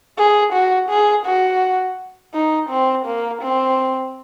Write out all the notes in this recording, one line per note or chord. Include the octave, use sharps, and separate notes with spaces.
G#4
F#4
G#4
F#4
D#4
C4
A#3
C4